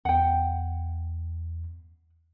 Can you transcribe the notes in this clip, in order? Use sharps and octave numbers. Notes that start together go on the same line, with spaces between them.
E2 F#5 G5